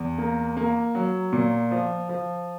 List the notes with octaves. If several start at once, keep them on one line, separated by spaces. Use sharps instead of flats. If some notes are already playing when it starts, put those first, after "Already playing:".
Already playing: E2
A#3
A#3
F#3
A#2
F3
F3